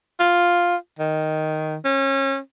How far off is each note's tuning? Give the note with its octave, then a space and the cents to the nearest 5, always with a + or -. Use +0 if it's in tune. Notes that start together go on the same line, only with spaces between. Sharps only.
F4 +5
D#3 +0
C#4 -30